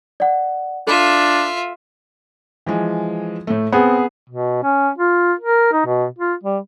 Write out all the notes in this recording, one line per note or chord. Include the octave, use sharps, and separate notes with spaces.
D5 F#5
D4 F4 A4 E5 E7
E3 F3 G#3
A2 A3
B3 C4 G#4
B2
C#4
F4
A#4
D#4
B2
F4
G3